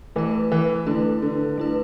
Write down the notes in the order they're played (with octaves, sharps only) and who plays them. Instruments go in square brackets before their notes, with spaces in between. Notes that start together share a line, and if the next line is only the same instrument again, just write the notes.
[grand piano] E3 [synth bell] A3 E4 B4
[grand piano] E3
[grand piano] D3 [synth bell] A3 E4 B4
[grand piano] D3
[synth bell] A3 E4 B4